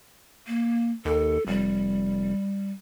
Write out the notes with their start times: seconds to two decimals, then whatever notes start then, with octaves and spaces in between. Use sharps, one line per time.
0.48 A#3
1.05 D#2 A4
1.47 F1 G3